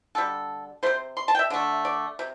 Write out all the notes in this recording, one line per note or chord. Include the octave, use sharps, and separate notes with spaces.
D3 G3 A4
C3 A3 C5
C6
A5
G5
E5
D3 A3
D5
C3